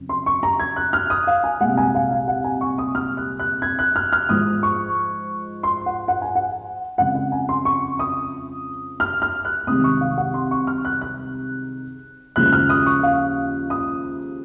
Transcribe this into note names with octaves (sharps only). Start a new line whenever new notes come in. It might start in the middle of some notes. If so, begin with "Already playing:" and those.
Already playing: F2 C#3 F#3
C6
C#6
A#5
G#6
F#6
F6
D#6
F5
G#5
C2 A#2 G#3 F#5
G#5
F5
F5
F#5
G#5
C#6
D#6
F6
F#6
F#6
G#6
F#6
F6
F6
G#2 F3 G#3 D#6
C#6
C6
F#5
F#5
G#5
F#5
F2 C#3 F3 G#3 F#5
F#5
G#5
C6
C#6
D#6
F6
F6
F#6
C2 C3 D#3 G#3 D#6
C#6
F5
F#5
C6
C#6
F6
F#6
F#6
D#2 C#3 F3 G#3 F#6
F#6
F6
D#6
C#6
F5
D#6